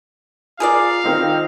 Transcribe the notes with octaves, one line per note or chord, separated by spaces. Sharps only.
F4 G#4 A#4 D5 F5
D#3 C4 D#4